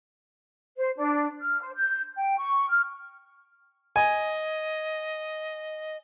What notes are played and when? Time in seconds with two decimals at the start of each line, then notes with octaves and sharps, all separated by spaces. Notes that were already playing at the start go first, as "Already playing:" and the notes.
0.77 C5
0.97 D4
1.42 F6
1.61 C5
1.75 G6
2.17 G5
2.39 C#6
2.69 F6
3.96 D#5 G#5